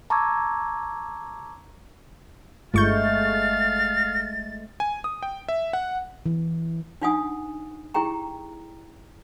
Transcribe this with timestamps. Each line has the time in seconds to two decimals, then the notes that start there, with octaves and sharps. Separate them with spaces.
0.10 A5 A#5 C#6 D6 E6 G#6
2.74 G1 G#3 A3 F5 C#6 G6 A6
4.80 G#5
5.04 D#6
5.23 G5
5.49 E5
5.73 F#5
6.26 E3
7.02 D4 D#4 F4 F#5 G#5 D#6
7.94 E4 G4 G#4 G5 A#5